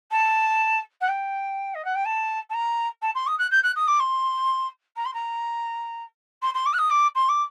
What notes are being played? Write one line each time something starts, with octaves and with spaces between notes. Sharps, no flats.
A5
F#5
G5
D#5
F#5
G5
A5
A5
A#5
A5
C6
D#6
F#6
G6
F#6
D#6
D6
C6
A#5
C6
A#5
C6
C6
D6
F#6
D#6
D6
C6
D6